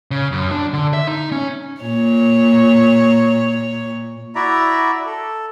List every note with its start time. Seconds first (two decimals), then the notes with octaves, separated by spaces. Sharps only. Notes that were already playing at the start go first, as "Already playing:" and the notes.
0.11 C#3
0.32 F#2
0.51 D4
0.74 D3
0.93 E5
1.07 D#4
1.32 C#4
1.81 A#2 C#5
4.35 E4 F#4 D5 E5 A#5
5.06 A4